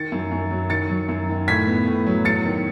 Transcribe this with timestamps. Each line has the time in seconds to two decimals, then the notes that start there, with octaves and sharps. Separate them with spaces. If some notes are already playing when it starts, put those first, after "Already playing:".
Already playing: D#3 A6 C#7
0.12 F#2
0.31 F#2
0.51 F#3
0.70 D#3 A6 C#7
0.90 F#3
1.08 F#2
1.29 D#3
1.48 A2 G#6 B6
1.67 B3
1.87 A2
2.07 F#3
2.25 E2 A6 C#7
2.45 D#3